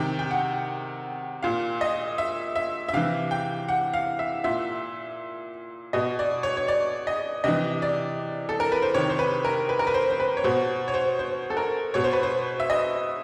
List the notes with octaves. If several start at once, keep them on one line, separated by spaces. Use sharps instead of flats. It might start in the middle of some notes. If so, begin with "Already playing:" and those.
Already playing: C3 D#3 G5
G5
F#5
A#2 F5
D#5
E5
E5
E5
C3 E3 F5
G5
F#5
F5
E5
A#2 E5
B2 D#5
D5
C#5
C#5
D5
D#5
C3 E3 D#5
D5
A4
A#4
B4
C5
C3 D#3 C#5
C5
B4
A#4
B4
A#4
B4
C5
C5
B4
C#5
B2 C5
C#5
C5
C5
A4
A#4
B2 C#5
C5
B4
C5
E5
D#5